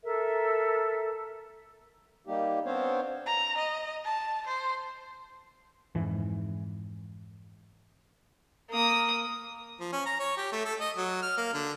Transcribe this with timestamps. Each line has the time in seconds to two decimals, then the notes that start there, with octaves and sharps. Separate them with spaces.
0.03 A4 A#4 E5
2.27 G3 A#3 D#4 G4
2.66 B3 C4 D4 C5 C#5 F5
3.26 A#5
3.57 D#5
4.05 A5
4.47 C5
5.95 F2 G#2 E3
8.70 A#3 D#6
9.80 F3
9.92 C#4
10.06 A#5
10.20 C#5
10.37 G4
10.52 A3
10.65 A4
10.80 D#5
10.96 F#3
11.22 F6
11.37 A#3
11.53 D3